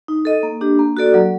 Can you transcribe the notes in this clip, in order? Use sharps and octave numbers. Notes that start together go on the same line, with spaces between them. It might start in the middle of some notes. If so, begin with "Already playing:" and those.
D#4
A4 D#5
A#3
D4 G4
A#3
F#4 A4 D5
F#3